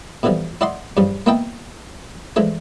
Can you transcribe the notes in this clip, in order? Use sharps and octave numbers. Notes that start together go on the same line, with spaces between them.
B2 D3 E3 F3 G3
E4 D5 D#5 F#5 C6
G2 C#3 F3 G3
A#3 B3 E4 D#5 G5 A5
E3 F3 G#3 A3 D4